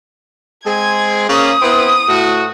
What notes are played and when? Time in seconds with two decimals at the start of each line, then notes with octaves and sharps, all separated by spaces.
0.65 G#3 C4 G#4 G#6
1.29 C#3 A#3 D#6
1.62 B3 C4 E4
2.07 A2 F#4